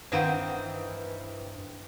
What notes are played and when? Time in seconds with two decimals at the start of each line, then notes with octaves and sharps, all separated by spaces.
0.12 G2 D#3 E3 C4 B4 F5 F#5